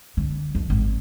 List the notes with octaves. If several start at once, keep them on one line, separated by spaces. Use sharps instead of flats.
D3
F2
G#1